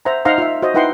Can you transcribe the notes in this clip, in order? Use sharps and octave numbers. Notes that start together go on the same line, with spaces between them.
C5 E5 F#5 A#5
D#4 C5 F5 F#5 A#5 C6
F4 E5
F#4 C5 D#5
D#4 E4 B4 F#5 G5 C6